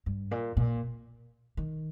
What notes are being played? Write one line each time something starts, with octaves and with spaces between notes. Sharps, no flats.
G2
A#2
A#2
D#3